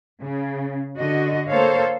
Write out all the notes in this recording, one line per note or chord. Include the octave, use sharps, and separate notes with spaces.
C#3
D3 F#4 D#5
A#3 A4 C5 C#5 F5